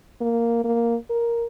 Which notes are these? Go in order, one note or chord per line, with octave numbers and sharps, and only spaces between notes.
A#3
A#3
A#4